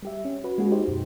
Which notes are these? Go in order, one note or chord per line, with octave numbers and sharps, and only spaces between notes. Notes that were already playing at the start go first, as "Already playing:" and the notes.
G3 G4 E5
C#4
F#4 B4
G#3 A#3 C#4 F#4 G#4
D#4 F#4 G4 C5
F#2 B2